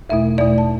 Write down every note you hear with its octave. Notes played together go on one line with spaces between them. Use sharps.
E2 B2 A3 E4 E5
E2 B2 A3 E4 D5
A5